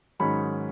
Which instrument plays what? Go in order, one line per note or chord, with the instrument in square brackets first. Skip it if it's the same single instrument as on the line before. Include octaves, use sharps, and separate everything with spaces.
[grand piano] G#2 D#3 F#3 C#4 B5